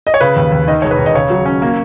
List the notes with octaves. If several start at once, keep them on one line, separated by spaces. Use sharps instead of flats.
D#5
C#5
C#3 B4
D#2
D#2
D#3 D#5
E1 C#5
B4
D#3
D#5
C#3 C#5
F#3
C#4
A#3